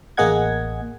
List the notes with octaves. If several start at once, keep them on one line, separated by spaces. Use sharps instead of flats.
A1 A#3 G#4 D#5 F#5 G#6